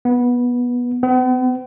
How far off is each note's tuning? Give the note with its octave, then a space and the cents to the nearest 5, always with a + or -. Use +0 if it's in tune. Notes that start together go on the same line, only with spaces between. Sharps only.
B3 -15
B3 +45